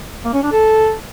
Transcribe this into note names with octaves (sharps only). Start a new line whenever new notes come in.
A#3
C#4
D4
A4